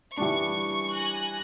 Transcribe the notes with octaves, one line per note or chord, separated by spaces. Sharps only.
E3 G3 D4 C#6
G#5 F#6 A#6